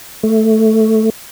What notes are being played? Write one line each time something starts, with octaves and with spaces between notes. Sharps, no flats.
A3